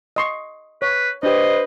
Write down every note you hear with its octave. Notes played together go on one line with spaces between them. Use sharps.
D#5 C6 C#6
B4 C#5
D4 G4 B4 C5 D#5